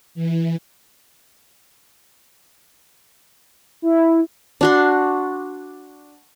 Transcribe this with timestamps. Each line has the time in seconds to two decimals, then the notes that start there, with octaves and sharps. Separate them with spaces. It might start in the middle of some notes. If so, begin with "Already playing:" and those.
0.15 E3
3.82 E4
4.61 D4 F#4 C6